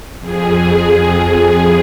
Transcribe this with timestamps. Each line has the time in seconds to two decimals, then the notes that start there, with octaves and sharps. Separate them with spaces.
0.19 F2 G#4